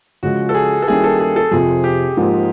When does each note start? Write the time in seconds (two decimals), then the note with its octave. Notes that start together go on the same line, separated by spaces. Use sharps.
0.23 C#3 F3 G#3 F#4
0.49 A4
0.54 G#4
0.82 A4
0.88 D#3 G3 A#3 C#4 E4 G#4
1.04 A4
1.20 G#4
1.36 A4
1.51 F2 C3 F3 G#4
1.84 G4
2.17 G#2 F3 A#3